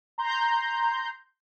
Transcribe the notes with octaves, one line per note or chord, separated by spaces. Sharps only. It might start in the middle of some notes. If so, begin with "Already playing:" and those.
A#5 C6 G6